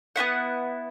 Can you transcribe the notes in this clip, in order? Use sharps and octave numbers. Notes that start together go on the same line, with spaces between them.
B3 D#4 E4 F#5